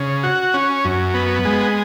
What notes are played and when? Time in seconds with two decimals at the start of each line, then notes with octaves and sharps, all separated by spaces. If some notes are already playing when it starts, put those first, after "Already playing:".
Already playing: C#3
0.23 F#4
0.54 C#4
0.85 F#2
1.14 B3
1.45 G#3